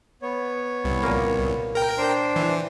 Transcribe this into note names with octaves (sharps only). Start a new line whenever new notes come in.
B3 C#5
C2
A#2 A#3
A#4 G5
D4 C5
E3